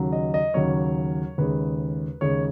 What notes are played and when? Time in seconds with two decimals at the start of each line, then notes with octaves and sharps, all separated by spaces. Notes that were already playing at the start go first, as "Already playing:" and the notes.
Already playing: D#2 C#3 F#3
0.12 D#5
0.34 D#5
0.54 D#2 C#3 F#3 C#5
1.38 D#2 C#3 G#3 B4
2.21 D#2 C#3 G#3 C#5